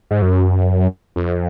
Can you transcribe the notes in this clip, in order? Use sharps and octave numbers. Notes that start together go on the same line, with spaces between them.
G#2
F#2
F2